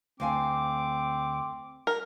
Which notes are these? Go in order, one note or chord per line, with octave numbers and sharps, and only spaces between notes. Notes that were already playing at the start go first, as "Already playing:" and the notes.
D2 C4 F5 G#5 D6
A#4